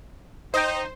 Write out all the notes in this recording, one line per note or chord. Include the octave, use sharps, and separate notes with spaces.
D#4 C5 D#5 G5